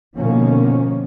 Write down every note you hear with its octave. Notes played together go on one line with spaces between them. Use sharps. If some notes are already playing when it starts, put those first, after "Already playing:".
B2 D3 D#3 F3 A#3 C#4